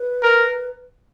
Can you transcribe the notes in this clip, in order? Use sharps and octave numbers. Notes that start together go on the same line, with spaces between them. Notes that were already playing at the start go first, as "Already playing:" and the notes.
Already playing: B4
A#4